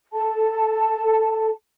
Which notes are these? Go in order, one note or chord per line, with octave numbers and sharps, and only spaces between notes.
A4 A5